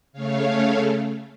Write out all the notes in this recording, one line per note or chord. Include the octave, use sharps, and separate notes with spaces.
C#3 A3 C#5 F5